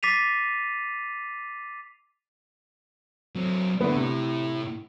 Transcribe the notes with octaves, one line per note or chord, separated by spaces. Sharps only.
D6 A6 B6 C7 D#7 F7
F#3 C4
A2 D3 B3 E4
C3